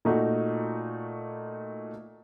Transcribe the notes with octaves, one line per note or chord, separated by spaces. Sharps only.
A#2 A3 D#4 F#4